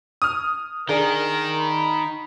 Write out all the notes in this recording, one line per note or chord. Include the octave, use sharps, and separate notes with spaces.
D#6 F6
D#3 D4 G#4 A#4
B5